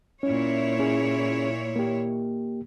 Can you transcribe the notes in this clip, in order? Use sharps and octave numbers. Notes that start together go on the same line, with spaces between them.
A#2 C#4 E4 C#5
C#4 G#4
A#3 G4